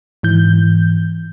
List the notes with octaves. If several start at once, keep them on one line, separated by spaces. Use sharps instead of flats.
G#2 E3 G6